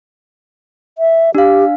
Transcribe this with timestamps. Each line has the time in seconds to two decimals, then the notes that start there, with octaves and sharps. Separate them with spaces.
0.98 E5
1.35 D4 G4 F5